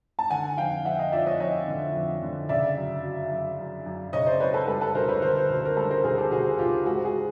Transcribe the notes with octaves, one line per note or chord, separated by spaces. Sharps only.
A5
D3 F#5 G#5
F2 F5 G5
F2 E5 F#5
D#5 F5
F3 D5 E5
C#5 D#5
F2 C#5 D#5
D3
F2
D3
C#3 D5 E5
F#2
F#3
F#2
F#2
F#2
C#3 C#5 D#5
C5 D5
F#2 B4 C#5
A4 B4
G3 A4 B4
A4 B4
D2 A#4 C5
B4 C#5
D3 A#4 C5
D2
A#4
G3 A4 B4
A#4 C5
D2 G#4 A#4
G4 A4
D2 F#4 G#4
D2 F4 G4
G#2 F#4 G#4
F#4 G#4